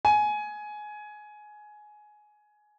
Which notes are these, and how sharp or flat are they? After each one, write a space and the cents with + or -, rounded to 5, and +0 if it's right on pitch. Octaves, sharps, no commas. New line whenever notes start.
G#5 +15